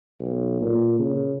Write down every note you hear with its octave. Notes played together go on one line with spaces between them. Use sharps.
B1
A#2
C#3